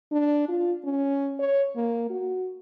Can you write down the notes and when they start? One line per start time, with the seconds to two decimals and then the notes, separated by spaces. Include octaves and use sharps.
0.12 D4
0.49 F4
0.85 C#4
1.39 C#5
1.76 A#3
2.10 F#4